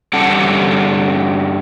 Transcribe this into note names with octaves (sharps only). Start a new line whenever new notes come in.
G2 G3 C#4 A4 F#5 A5